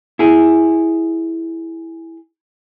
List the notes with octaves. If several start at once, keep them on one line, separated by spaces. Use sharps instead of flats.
E4 G#4